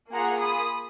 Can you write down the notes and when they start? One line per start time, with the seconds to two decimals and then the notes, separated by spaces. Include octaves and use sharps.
0.13 A#3 F4 G#4 F#5 A#5
0.41 B5 D#6